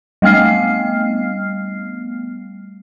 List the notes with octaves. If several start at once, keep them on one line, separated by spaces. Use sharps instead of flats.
G3 A3 B3 F6 C7